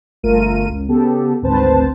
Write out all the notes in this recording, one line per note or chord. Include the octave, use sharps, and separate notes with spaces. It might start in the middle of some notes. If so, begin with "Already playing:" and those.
G1 A3 F4 A#4 D#7
C#2
C#3 B3 G4 A4
G#1 D2 C4 B4 C5 A5